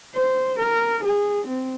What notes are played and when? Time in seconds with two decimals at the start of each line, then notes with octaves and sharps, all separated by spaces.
0.14 C5
0.59 A#4
1.04 G#4
1.47 C4